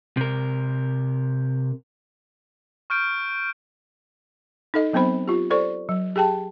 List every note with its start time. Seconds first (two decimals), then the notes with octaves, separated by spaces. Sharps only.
0.17 C3 A#4
2.90 C#6 F6 G6 D7
4.74 D#4 A4 D#5
4.93 F#3 B3 C4 C5 B5
5.28 F4 G4
5.50 A4 C5 D5 C#6
5.89 F#3
6.16 G4 G#4 G5 A5